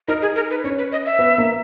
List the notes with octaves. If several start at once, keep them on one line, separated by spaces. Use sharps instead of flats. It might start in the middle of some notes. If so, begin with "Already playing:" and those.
D#4 A#4
G#4
A#4
B4
C#4 C#5
B4
D#5
E5
B3
A#3